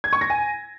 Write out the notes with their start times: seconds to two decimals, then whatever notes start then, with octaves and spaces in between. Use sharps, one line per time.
0.04 G#6
0.13 C#6
0.21 A#6
0.30 G#5